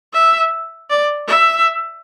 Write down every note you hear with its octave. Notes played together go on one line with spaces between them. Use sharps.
E5
D5
E5